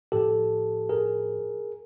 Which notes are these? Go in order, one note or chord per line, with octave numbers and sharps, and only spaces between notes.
A2 F3 G4 A4
G#4 A#4